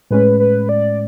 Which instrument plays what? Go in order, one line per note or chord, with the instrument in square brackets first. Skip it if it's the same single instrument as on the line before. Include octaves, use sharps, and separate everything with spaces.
[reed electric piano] A2 G#3 C#4 [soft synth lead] B4
[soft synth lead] B4
D5